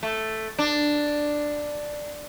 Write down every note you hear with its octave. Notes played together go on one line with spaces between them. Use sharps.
A3
D4